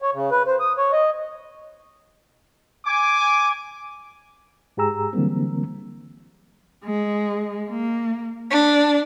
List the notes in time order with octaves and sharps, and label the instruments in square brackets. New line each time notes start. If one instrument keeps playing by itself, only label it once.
[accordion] C#5
C#3
B4
C5
D#6
C#5
D#5
[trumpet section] G#5 D6
[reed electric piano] G#2 G4 G#4 A#5 E6
D3 E3 F#3 G3 A#3 C4
[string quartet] G#3
A#3
D4